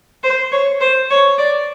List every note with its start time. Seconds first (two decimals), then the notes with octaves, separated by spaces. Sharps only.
0.23 C5
0.52 C#5
0.80 C5
1.10 C#5
1.38 D5